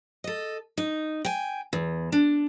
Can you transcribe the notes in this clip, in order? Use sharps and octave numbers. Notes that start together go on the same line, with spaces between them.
A4 D#5
D#4
G5 G#5
E2
D4